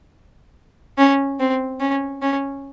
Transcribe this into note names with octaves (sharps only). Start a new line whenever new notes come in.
C#4
C4
C#4
C#4